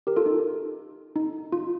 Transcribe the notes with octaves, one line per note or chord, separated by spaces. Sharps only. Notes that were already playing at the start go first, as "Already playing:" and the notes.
G4 A#4
F4 A4
D#4
D#4
F4